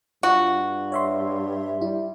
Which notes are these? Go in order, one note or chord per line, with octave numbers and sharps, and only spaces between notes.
G2 F4 F#4
C#5 E5 C6
G3 E4